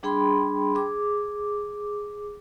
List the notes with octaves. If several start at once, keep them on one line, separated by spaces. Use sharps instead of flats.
G3 D4 G#4 G5 B5 C6
G#4 D6